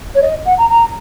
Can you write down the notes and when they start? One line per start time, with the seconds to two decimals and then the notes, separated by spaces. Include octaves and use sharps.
0.15 C#5
0.22 D#5
0.46 F#5
0.58 A#5
0.70 A#5